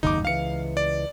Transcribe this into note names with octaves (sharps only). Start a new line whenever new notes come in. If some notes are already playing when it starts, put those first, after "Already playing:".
F#1 D#2 G#2 D#4 D6
C#2 E3 F5 C#7
D5